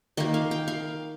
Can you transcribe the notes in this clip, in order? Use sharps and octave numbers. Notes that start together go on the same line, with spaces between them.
D#3 A#3 D#5
F5
G5
F5